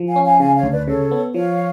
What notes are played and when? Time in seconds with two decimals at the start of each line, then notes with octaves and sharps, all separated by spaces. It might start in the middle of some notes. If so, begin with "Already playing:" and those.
Already playing: F3
0.08 F5 G#5
0.16 C#4
0.24 F5 G#5
0.40 C#3 F5 G#5
0.55 C#5 F5
0.63 D2
0.71 B4 D5
0.88 C#3 A4 C#5
1.11 B3
1.34 F3 C#5 F5